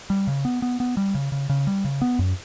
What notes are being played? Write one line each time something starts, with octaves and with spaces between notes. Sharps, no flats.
G3
C#3
B3
B3
B3
G3
C#3
C#3
C#3
G3
C#3
B3
F#2